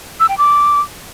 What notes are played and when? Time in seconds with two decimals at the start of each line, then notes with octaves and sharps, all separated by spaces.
0.20 E6
0.29 G5
0.38 D6